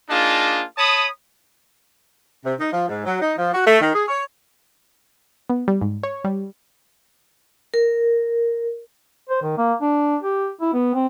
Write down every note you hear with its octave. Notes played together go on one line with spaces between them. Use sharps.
A#3 D4 D#4 F4 G#4 A5
C#5 A5 B5 D#6
C3
D#4
F3
G#2
F#3
D#4
F3
F#4
A3
D#3
G#4
C#5
B3
G3
G#2
C#5
G3
A#4
C5
D#3
A#3
D4
G4
E4
B3
C4